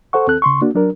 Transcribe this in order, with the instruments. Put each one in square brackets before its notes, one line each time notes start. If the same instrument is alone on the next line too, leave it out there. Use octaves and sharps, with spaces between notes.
[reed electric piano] A4 C5 F#5 C#6
D#2 C4 A4 F#6
C#3 C6 C#6
A#3 D4 F#4
F#3 D4 A#4